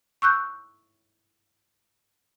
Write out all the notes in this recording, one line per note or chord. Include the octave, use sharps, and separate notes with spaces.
C#6 E6 F#6 G6